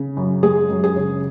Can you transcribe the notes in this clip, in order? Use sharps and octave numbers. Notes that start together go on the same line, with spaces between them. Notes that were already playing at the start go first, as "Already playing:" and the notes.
Already playing: C#3
F#2
G#3 G#4
F#2
G#4
C#3